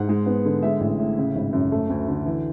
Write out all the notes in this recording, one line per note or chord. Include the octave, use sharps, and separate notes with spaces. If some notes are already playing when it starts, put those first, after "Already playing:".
Already playing: G#2 F#5
G#3
B3
D3
G#3 E5
A1
A2
C#3
G#1
F#2
A3
D2
D3
E3